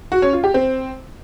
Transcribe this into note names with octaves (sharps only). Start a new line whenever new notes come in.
F#4
C#4
F4
G4
C4